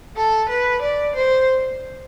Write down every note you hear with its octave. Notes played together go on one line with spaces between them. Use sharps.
A4
B4
D5
C5